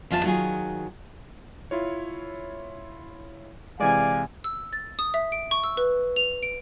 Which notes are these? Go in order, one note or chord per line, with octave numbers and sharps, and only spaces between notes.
E2 F3 F4 C#5 A5
D#3 F#3 F4 G#4
E4 F4 C#5
C3 E3 G#3 D5 F5 G#5
E6
A6
D#6
E5
D7
C#6
E6
B4
F7
D7